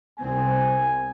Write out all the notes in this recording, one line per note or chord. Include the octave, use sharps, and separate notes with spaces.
C2 C4 G#5